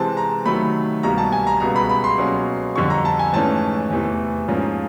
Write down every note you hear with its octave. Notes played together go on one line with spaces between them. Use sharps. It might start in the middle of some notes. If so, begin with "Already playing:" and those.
Already playing: C3 E3 G#3 C4 A5
A#5
C3 D#3 F#3 A3 B5
C2 B2 G3 A#3 A#5
A5
G#5
A#5
C#2 B2 G3 B3 A#5
B5
B5
C6
B2 F#3 A#3 C#4
F2 D3 G3 C#6
A#5
A5
G#5
G#2 E3 A3 C#4 A5
E2 C3 E3 A3
G#2 F3 A#3 C#4